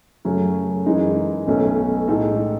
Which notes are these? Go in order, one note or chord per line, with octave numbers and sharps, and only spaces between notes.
F#2 C#3 F#3 A3 C#4
F#2 E3 G#3 D#4
B1 B2 A3 C#4
A2 G#3 D#4 A4